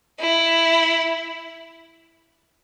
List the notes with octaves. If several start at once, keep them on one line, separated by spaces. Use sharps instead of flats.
E4